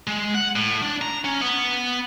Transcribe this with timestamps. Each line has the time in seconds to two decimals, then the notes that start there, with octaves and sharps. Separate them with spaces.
0.07 G#3
0.35 F#5
0.56 A2
0.82 D4
1.01 A#5
1.24 C#4
1.41 B3